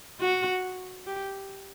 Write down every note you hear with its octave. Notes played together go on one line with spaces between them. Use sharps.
F#4
G4